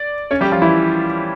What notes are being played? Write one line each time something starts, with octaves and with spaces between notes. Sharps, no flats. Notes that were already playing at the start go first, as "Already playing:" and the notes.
Already playing: D5
C#4 C#5
G3 G4
F3 F4
E3 E4